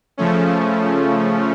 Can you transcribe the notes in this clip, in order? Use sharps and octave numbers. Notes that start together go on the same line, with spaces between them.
C#3 F3 A3 C#4